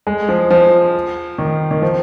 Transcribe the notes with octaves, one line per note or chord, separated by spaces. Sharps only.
G#3
F3
F3
D#3
D#3
F3